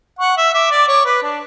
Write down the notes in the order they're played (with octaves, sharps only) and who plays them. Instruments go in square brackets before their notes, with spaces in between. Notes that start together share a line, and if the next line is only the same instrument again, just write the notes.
[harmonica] F#5 [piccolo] C#6
[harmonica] E5 [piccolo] E6
[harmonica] E5 [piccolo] D6
[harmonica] D5
C#5
B4
D4